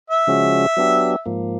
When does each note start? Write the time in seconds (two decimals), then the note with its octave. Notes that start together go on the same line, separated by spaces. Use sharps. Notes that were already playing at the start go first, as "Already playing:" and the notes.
0.10 E5
0.27 C#3 F3 G#3 C#4 F#4
0.77 F#3 B3 D4 G4
1.26 G#2 F3 A#3